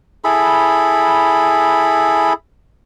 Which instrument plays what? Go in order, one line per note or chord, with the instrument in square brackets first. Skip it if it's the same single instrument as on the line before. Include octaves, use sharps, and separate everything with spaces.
[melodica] E4 G#4 A4 B5